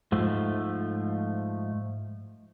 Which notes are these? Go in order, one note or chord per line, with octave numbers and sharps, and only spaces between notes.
G#2 F3 A3